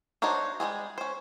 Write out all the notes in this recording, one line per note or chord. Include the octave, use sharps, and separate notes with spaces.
D4 D#4 F#4 C5 C#5
G3 G#3 C4 G#4
C#4 C5